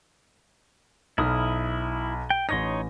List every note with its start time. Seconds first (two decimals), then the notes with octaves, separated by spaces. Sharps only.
1.18 B1 E4 D#6 F6
2.30 G5
2.49 A1 D#4 C#5 C6 A#6